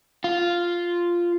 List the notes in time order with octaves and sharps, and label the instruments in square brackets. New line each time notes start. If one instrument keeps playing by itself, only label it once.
[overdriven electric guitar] F4